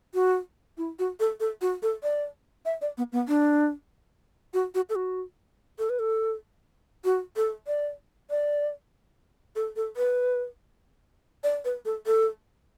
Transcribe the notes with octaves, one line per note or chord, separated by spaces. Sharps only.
F#4
E4
F#4
A4
A4
F#4
A4
D5
E5
D5
B3
B3
D4
F#4
F#4
A4
F#4
A4
B4
A4
F#4
A4
D5
D5
A4
A4
B4
D5
B4
A4
A4